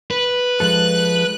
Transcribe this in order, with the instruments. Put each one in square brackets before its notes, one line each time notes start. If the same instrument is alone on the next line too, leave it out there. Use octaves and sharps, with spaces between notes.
[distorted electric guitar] B4
[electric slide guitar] F3 G#3 A4 [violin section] F#6